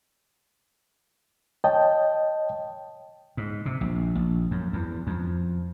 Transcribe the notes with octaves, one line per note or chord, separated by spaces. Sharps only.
C#5 D#5 G5 A5
G#2
C3
A#1
A#1
F#2
E2
F2